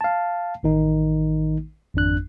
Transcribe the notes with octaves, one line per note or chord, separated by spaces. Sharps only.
F5 A5
A1 D#3 D#4
G#1 F2 D4 F#6